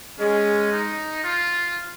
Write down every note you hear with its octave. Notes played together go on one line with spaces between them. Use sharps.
G#3 C#4
D#4
F4